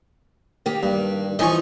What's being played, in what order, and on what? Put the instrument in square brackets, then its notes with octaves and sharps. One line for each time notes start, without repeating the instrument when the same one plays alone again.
[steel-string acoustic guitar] D#3 A#3 G4
[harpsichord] G2
[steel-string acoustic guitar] E3 F3 D#4 [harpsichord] D#5 G#5 C#6